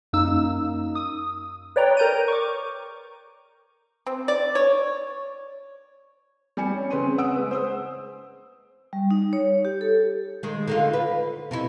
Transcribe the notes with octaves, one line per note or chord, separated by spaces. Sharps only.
F#2 A#3 D#4 E6
D#6
B4 C#5 D5 G5 A#5
A#4 A#5 G6 D7 D#7
C#6 D6
C4
D5
C#5
G3 G#5 C#7
C#4
C#3 C4 B4 C6 D#7
F#5 D#6 E6 D7
G#3 B4
C5 D#6 E6
G3
D#4
C#5
G4
A4
D#3 G#3
D3 D#4 F4
B4
C3 D#4 E4